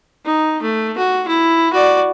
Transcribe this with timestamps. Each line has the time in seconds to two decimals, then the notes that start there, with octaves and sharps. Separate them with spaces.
0.25 D#4
0.62 A3
0.98 F#4
1.28 E4
1.73 F#4 D5